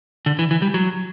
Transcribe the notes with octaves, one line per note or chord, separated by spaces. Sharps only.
D3
E3
E3
G3
F#3